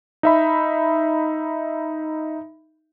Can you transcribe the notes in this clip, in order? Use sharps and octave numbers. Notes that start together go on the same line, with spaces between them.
D#4 E5 B5